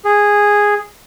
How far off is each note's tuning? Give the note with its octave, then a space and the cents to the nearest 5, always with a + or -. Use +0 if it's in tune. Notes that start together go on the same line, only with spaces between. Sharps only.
G#4 -10